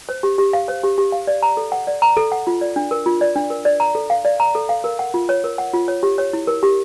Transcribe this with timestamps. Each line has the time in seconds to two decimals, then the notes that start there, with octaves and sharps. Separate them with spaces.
0.09 C5
0.23 G4
0.38 G4
0.53 F5
0.68 C5
0.83 G4
0.98 G4
1.12 F5
1.27 D5
1.43 A#5
1.57 A4
1.72 F#5
1.87 D5
2.02 A#5
2.17 A4
2.32 F#5
2.47 F4
2.61 D5
2.76 D4
2.91 A#4
3.06 F4
3.21 D5
3.36 D4
3.50 A#4
3.65 D5
3.80 A#5
3.95 A4
4.10 F5
4.25 D5
4.40 A#5
4.55 A4
4.69 F5
4.84 A#4
4.99 F#5
5.14 F4
5.29 C#5
5.44 A#4
5.58 F#5
5.74 F4
5.88 C#5
6.03 G4
6.18 C#5
6.33 E4
6.47 A#4
6.63 G4